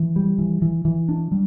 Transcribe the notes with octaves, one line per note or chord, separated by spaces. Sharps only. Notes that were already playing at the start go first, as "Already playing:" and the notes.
Already playing: E3
G3
E3
E3
E3
D4
G3